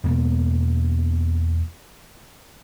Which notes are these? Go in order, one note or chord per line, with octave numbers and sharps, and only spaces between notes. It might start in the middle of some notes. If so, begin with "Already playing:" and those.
E2 B2 A#3